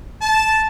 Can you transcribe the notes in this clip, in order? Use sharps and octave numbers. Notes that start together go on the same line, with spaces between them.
A5